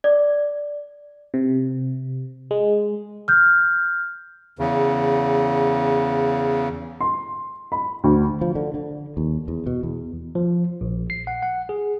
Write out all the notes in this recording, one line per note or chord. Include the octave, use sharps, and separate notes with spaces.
D5
C3
G#3
F6 G6
E2 C#3
C6
B5
D2
F3
D3
D3
D#2
E2
B2
E2
F3
A#1
C7
F#5
F#5
G#4